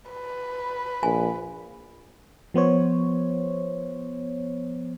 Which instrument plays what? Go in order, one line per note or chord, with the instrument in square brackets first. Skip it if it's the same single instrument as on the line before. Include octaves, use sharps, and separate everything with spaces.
[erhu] B4
[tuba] A#1 [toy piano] G#5
[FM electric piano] F3 B3 C5 C#5